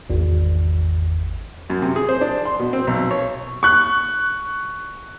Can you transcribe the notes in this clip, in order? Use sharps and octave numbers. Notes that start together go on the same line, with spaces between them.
G#1 E2
F#2
C3
G#4
C5
D4
C6
B2
C4
B1
C#5
C#6 F#6